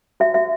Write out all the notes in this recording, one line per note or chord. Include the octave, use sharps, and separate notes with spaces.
F#4 E5
F#4 E5